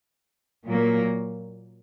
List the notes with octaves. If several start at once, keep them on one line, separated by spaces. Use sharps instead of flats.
A#2 F#3 A#3